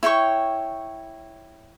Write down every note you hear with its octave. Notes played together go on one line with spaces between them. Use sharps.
E4 C#5 G5 C#6